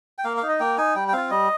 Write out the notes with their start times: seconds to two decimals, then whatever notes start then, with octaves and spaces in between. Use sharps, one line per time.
0.18 G5
0.25 A#3 F5
0.37 F5
0.43 D#4
0.49 D#5
0.60 A#3 G5
0.78 D#4 G#5
0.95 G3 G5
1.08 G5
1.13 C4 F4 F5
1.31 G3 D#5